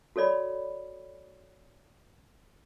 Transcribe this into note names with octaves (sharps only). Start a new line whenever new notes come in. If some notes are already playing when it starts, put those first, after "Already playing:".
F#4 A4 C#5 D5 B5